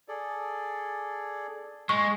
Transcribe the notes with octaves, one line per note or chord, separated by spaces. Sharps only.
G#4 A4 D5
G#3 C#6